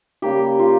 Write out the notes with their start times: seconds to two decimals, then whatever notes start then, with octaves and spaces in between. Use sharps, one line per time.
0.22 C#3 G3 A#3 G4
0.59 F4